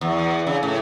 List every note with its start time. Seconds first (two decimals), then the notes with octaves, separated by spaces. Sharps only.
0.01 E2
0.47 C#3
0.63 A2